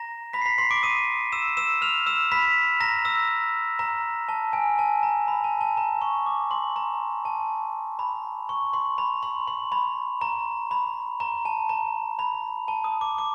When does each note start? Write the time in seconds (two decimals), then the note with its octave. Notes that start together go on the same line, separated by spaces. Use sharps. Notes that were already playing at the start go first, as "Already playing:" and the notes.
Already playing: A#5 A#6
0.33 B5 B6
0.42 C7
0.45 B5 B6
0.58 C6 C7
0.71 D6 D7
0.83 D#6 D#7
1.32 E6 E7
1.57 E6 E7
1.82 F6 F7
2.07 E6 E7
2.32 B5 B6
2.80 A#5 A#6
3.05 E6
3.79 A#5
4.29 A5
4.53 G#5
4.79 A5
5.03 A#5
5.28 B5
5.44 A5
5.61 A5
5.77 A#5
6.01 C#6
6.26 D6
6.51 C6
6.76 A#5
7.25 A5
7.99 B5
8.49 C#6
8.73 C6
8.98 B5
9.23 C6
9.48 C6
9.72 B5
10.21 A#5
10.71 B5
11.20 A#5
11.45 A5
11.69 A#5
12.19 B5
12.68 A5
12.84 D#6
13.01 D6
13.18 D6